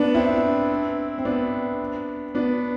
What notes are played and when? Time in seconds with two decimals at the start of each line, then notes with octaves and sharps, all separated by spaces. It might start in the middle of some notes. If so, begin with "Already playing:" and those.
Already playing: B3 D4
0.15 C4 E4
1.18 C4
1.25 B3 D4
2.35 B3 D4